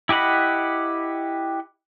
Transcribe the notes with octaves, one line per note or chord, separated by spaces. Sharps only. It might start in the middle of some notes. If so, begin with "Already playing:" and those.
E4 G4 D#5 F#5 B5